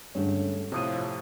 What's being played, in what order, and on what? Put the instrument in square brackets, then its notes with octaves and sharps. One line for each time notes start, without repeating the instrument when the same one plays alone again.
[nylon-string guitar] G2 A3 [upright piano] D3 G#3 C#4
[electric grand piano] A2 C3 [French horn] F3 [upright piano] C#5 D#6 D#7 [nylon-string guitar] D#5